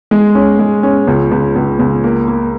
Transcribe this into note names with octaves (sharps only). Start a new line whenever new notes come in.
G#3
C#4
G#3
C#4
C#2
C#2
C#2
C#2
A#3
A#3